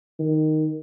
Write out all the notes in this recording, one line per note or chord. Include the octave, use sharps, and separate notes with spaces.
D#3